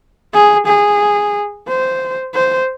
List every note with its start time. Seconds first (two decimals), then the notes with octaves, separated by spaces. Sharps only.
0.34 G#4
0.67 G#4
1.68 C5
2.34 C5